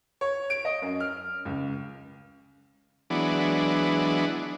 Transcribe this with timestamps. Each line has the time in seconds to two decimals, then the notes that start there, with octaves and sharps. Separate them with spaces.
0.21 C#5
0.50 D7
0.65 D#5
0.82 F#2
1.00 F6
1.45 C#2
3.10 E3 F#3 G#3 B3 D4